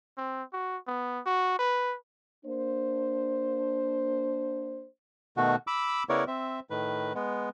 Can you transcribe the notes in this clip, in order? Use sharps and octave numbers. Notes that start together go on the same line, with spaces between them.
C4
F#4
B3
F#4
B4
A#3 D4 C5
B2 D#3 A3 F#4
B5 D6 E6
C#3 B3 E4 A#4 C#5 D5
C4 E5
A2 D#3 B4
G#3 B3